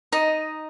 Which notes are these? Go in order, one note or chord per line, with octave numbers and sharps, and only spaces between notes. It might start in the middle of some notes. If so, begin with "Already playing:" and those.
D#4 D#5